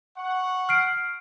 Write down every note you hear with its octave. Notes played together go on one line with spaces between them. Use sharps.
F#5 C#6
F6 C7 D7